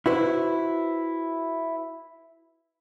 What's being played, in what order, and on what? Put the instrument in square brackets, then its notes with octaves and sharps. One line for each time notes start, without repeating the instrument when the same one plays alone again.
[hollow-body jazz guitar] E4 F#4 B4 C5